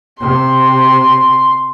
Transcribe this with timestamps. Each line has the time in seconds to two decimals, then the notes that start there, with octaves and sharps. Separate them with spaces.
0.20 C3 C6